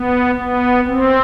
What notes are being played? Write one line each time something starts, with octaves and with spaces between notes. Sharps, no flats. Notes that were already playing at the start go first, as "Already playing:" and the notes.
Already playing: B3
B3
C4